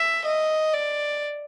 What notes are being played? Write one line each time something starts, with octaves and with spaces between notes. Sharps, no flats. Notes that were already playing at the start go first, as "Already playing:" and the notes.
Already playing: E5
D#5
D5